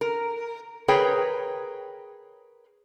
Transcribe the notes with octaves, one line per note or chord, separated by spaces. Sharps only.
A#4
G#4 A#4 B4 C#5 G5